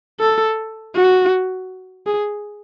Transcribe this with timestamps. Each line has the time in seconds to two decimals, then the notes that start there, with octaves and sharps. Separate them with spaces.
0.20 A4
0.95 F#4
2.06 G#4